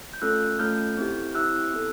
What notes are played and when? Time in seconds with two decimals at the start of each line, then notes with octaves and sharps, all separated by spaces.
0.14 G6
0.22 A3 C#4 F4 A4 E6 F#6
0.59 A3 C#4 F4 A4 F6 G6
0.97 C4 E4 G4
1.35 C4 E4 G4 E6 F#6
1.74 B3 E4 A4